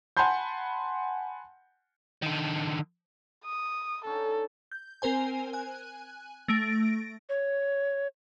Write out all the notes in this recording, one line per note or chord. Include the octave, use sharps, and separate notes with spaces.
F#5 G#5 A5 B5 C6 G6
D3 D#3
D#6
D3 C#4 D#4 A4
G6
C4 A#4 C5 G#5
G#5 F#6
A3 A#6 D7
C#5